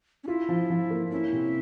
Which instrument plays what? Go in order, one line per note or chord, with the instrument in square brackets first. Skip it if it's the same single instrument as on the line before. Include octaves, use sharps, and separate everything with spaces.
[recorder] C#4
[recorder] E4 [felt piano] F4
[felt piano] F3
F3
A#3
[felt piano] C#4 [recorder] E4
[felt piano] C3